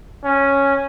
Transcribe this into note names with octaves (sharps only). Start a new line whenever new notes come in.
C#4